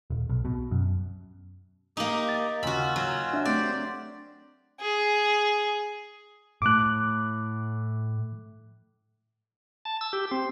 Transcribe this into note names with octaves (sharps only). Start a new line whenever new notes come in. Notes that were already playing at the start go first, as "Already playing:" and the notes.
D#1
B1
B2
F#2
A#3 D#4 G4
A6
D#2 C#3 C#4 F4 F#4 B5 E6
F#3
D4 E5
A3 C4 D4 G4 C5 D5
G#4
A2 A3 D6 F#6
A5
E6
G4
C4